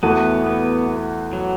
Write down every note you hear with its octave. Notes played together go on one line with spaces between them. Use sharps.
E2 E3 A3 B3 F#4
B3
F#3